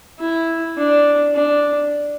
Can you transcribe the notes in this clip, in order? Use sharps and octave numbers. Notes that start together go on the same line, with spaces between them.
E4
D4
D4